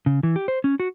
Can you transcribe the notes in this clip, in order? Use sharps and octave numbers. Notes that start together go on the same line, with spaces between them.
C#3
E3
G4
C5
C#4
F#4